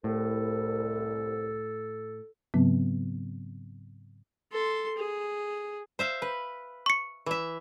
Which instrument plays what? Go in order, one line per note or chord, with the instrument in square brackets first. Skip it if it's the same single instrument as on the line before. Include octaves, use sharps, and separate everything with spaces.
[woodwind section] C2 [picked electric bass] A2 [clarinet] A4
[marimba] G#2 C#3 F#3 B3 C4
[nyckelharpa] A4 C6
G#4
[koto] C5 E5 F5
B4
[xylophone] C#6 C#7
[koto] E3 E5